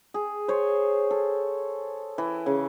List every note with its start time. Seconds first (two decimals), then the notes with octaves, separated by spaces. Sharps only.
0.14 G#4
0.48 C5 C#5
1.11 A4
2.18 E3
2.46 C#3